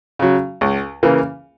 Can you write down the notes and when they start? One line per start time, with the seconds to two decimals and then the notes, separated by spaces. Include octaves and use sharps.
0.19 C#3 F#3
0.61 C#2
1.03 C#3 E3 A#3